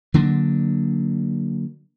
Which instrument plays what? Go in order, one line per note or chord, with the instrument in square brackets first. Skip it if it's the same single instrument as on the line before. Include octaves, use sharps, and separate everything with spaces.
[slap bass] D3 F#3 A#3 D4